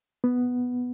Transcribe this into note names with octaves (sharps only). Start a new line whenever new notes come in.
B3